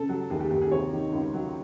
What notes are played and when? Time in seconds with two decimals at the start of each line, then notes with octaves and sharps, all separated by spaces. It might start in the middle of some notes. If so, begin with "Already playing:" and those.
Already playing: C#3 A4
0.09 F#3
0.30 D#2 G#4
0.40 G4
0.50 D#2 G4
0.62 G#4
0.71 C3 C#5
0.93 D#3
1.12 C#2
1.34 F#3